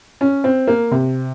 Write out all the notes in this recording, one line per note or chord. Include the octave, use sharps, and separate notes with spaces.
C#4
C4
A#3
C3